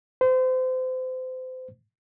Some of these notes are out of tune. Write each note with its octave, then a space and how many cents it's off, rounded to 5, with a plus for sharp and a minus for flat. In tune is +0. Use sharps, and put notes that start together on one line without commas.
C5 -30